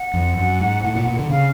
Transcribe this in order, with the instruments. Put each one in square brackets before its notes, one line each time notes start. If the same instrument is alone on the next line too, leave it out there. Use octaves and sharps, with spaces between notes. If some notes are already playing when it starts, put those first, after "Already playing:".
Already playing: [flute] F#5
[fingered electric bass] F2
F#2
G#2
A2
A#2
A#2
D3
[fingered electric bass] C#3 [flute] F5